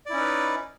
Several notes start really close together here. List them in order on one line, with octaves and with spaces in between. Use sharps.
D5 E4 C#4 D#4 B4